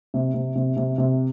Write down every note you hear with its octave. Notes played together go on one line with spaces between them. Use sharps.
C3
C3
C3
C3
C3